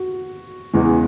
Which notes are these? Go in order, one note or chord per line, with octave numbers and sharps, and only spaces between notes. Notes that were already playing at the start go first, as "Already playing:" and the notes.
Already playing: F#4
E2 C#3 E3 G#3